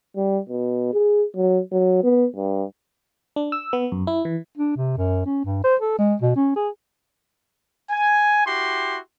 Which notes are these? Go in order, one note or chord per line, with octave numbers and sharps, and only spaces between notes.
G3
B2
G#4
F#3
F#3
B3
G2
D4
E6
B3
F#2
E4
E3
D4
C3
F#2
C#4
G2
C5
A4
G#3
B2
C#4
G#4
G#5
E4 F#4 G4 C6